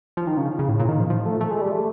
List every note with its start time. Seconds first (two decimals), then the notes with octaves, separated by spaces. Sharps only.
0.17 F3
0.27 D#3
0.37 C#3
0.59 C#3
0.69 A2
0.79 A#2
0.89 D#3
1.00 F3
1.10 F3
1.26 A3
1.41 A3
1.51 G#3
1.61 G3
1.71 A3